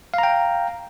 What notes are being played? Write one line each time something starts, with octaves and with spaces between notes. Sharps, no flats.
F5 G5 A#5